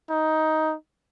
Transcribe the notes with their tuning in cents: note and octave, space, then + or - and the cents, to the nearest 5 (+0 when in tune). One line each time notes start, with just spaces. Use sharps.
D#4 +10